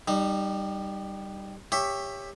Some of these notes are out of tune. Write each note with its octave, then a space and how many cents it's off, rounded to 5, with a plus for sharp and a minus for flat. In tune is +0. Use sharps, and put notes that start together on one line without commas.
G3 +0 D#4 -30
G4 +20 C#5 +0 E5 +0